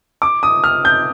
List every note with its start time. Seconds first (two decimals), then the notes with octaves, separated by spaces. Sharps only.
0.22 D6
0.43 D#6
0.64 F6
0.85 G6